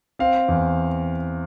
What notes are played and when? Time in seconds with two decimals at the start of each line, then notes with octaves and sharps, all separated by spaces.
0.19 C4 F5
0.48 E2